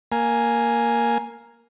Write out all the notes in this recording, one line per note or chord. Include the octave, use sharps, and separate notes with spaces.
A#3 G#5